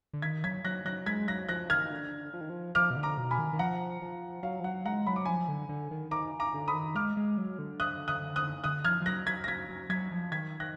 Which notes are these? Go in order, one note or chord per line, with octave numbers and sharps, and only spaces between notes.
D3
D#3 G#6 B6
F#3 G#6 B6
F#3 F#6 A#6
F#3 F#6 A#6
G#3 G#6 B6
F#3 F#6 A#6
F3 F#6 A#6
D#3 F6 G#6
D3
F3
D#3
F3
F3 D6 F6
B2
D3
A#5 D6
B2
G#5 B5
D#3
D#3
F3 F#5 A#5
F3
F#3 F5
F3
F#3 F#5
G#3 F#5 A#5
F#3 B5
D6
F3 G#5 B5
D3
D3
D#3
D#3 A#5 D6
A#5 D6
D3
B5 D#6
D#3
G#3 D6 F6
G#3
F#3
D3
D#6 F#6
D#6 F#6
D#6 F#6
D3 D#6 F#6
F3 F6 G#6
F3
F#3 F#6 A#6
F#3 G#6 B6
A#6
F#3 G#6 B6
F#3
F#3 G#6 B6
F3
D#3 G#6 B6
D#3 F#6 A#6